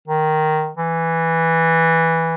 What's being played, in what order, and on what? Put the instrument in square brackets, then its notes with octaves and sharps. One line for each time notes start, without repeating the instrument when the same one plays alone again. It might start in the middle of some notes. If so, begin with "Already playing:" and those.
[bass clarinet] D#3
E3